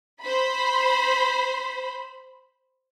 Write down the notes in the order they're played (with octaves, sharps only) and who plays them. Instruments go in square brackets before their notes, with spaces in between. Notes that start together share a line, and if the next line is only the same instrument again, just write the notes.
[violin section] C5 B5